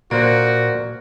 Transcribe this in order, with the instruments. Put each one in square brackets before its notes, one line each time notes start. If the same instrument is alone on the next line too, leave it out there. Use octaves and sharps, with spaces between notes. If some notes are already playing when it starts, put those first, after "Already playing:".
[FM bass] A#2 [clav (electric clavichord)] A#3 C5 [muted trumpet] F#4 [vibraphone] D5